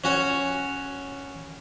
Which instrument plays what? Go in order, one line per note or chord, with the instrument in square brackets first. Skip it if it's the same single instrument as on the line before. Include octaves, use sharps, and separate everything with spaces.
[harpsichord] C#4 F#4 C#5